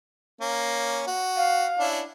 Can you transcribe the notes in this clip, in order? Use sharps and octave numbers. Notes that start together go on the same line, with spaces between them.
A#3 C#4
F#4
F5
C#4 D4 E4